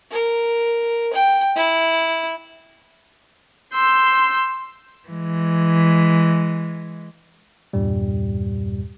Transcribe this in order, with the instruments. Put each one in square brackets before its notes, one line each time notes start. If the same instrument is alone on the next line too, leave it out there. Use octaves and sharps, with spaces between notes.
[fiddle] A#4
G5
E4
[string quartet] C6 E6 G6
[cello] E3 G#3
[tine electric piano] E2 G2 A#2 G3